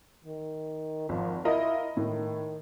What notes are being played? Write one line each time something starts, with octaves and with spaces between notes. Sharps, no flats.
D#3
G#1 F3
E4 F4 A#4 D#5
A2 D#3